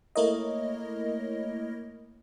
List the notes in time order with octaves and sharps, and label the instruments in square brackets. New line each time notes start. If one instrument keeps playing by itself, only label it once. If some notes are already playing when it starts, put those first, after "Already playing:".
[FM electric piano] A3 A#3 E4 A#4 C#5 D#5